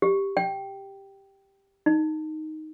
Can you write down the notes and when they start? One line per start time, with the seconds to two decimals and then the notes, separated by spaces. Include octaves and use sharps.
0.02 G4
0.37 G5
1.86 D#4